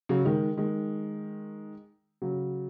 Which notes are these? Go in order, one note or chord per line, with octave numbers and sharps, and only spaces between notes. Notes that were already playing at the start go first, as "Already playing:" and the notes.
C#3 F#3
D#3 G#3
D#3 G#3
C#3 F#3